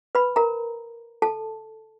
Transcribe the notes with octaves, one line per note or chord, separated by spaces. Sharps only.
B4 B5
A#4 A#5
A4 A5